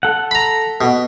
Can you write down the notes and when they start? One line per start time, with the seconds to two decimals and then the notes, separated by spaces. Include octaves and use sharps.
0.03 A4 F#5
0.31 A#5 B5
0.81 B2